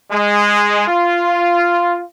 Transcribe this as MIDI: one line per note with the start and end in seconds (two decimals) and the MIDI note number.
0.10 0.83 56
0.87 2.01 65